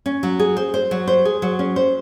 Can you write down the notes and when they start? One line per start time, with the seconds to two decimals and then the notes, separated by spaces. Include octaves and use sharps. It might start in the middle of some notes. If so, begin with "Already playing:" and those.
0.06 C#4
0.23 F#3
0.39 G#4
0.57 C5
0.74 C5
0.91 F#3
1.07 C5
1.25 G#4
1.42 F#3
1.59 C#4
1.76 C5